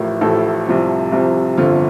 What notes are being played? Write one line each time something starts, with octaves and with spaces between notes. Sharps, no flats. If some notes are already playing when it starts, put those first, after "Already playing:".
Already playing: A1 A2 F3 A#4
A1 A2 F3 A4
C2 C3 F3
C2 C3 F3
G1 F2 D3 F3 F4